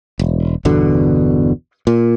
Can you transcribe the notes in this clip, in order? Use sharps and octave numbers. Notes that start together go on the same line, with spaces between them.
E1
G1 E2 B2 D3
A#2